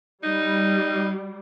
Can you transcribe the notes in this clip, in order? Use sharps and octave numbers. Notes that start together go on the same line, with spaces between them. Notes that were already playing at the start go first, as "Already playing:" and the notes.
G3 D#4